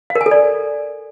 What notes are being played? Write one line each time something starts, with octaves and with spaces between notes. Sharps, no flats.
F5
A#4
G#5
A4
D5